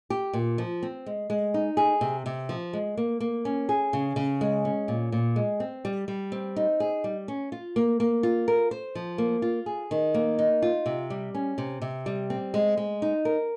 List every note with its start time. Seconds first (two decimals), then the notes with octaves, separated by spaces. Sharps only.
0.10 G4
0.33 A#2
0.58 F3
0.82 C4
1.06 G#3
1.30 G#3
1.54 D#4
1.77 G#4
2.01 C3
2.26 C3
2.49 F3
2.73 G#3
2.97 A#3
3.20 A#3
3.45 C#4
3.69 G#4
3.93 C#3
4.16 C#3
4.41 G#3
4.65 C#4
4.88 A#2
5.12 A#2
5.36 G#3
5.60 C4
5.85 G3
6.08 G3
6.32 C4
6.56 D#4
6.80 G#4
7.04 G3
7.28 C#4
7.52 F4
7.76 A#3
8.00 A#3
8.23 F4
8.48 A#4
8.71 C5
8.95 F3
9.18 A#3
9.42 F4
9.66 G#4
9.91 D#3
10.14 A#3
10.38 D#4
10.62 F4
10.86 C3
11.10 G3
11.34 C#4
11.58 C3
11.82 C3
12.06 G3
12.30 C4
12.54 G#3
12.77 G#3
13.02 D#4
13.25 A#4